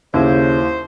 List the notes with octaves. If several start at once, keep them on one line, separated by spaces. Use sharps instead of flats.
D#2 C#3 E4 C5